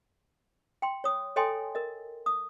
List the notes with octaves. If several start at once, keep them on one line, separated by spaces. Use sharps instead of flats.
G5 C6
C#5 D#6
A4 C#5 D#5 G5 G#5 C6
A#4 D#5
D#6